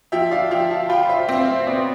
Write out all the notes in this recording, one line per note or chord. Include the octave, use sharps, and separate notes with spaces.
F3 E5 G5
D5 F5
F3 E5 G5
F5 A5
F4 G5 B5
C5 E5
C4 D5 F5
C5 E5
B2 B4 D5